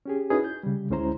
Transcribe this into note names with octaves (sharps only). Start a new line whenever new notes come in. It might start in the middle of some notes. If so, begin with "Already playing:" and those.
C#4 G4 G#4
C#4 D#4 E4 F#4 G#4 B4
G6
C#3 G3
D2 G#3 C#4 E4 C5 A#5